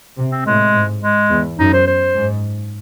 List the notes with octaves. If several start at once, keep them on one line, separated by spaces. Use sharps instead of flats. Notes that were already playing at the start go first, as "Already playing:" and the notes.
C3
C4
A2 G#3
G#2
G#3
E2
F#2 D#4
C5
C5
G#2